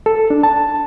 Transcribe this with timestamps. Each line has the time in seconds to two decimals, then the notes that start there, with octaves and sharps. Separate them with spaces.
0.06 A4
0.30 D4
0.43 A5